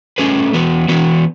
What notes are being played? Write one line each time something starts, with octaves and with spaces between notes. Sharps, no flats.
A3 C#4 G#4 B4
E3 B3 F#4 B4
E3 B3 F#4 B4